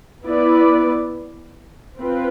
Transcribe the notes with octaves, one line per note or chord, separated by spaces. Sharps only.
B3 E4 B4 D5
C4 F4 B4